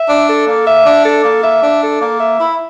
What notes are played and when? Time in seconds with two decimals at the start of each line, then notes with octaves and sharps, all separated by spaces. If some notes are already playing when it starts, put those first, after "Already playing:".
Already playing: E5
0.10 D4
0.29 A4
0.48 A#3
0.67 E5
0.86 D4
1.06 A4
1.25 A#3
1.44 E5
1.63 D4
1.82 A4
2.02 A#3
2.20 E5
2.39 E4